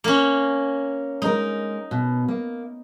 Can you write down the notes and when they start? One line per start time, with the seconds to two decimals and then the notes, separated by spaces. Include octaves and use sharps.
0.04 A#3 C#4
1.22 G#3 D#4 A#4
1.91 B2
2.28 A#3